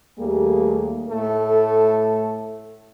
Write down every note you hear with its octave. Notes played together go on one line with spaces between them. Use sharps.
D#2 G3 A3 A#3 G#4
A2 A3 A4